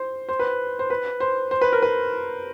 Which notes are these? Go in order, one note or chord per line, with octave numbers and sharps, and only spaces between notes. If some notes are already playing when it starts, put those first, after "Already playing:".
Already playing: C5
C5
B4
C5
B4
C5
C5
B4
A#4
B4